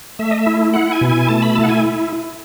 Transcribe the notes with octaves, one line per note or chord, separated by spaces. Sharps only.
A3 E5
D#5
E5
E4
E4 F#5
G#5
B2
G#5
A3 A5
B5
E4 A5
F#5
G#5